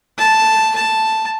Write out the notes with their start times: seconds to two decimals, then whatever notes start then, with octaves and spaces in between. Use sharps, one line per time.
0.19 A5
0.75 A5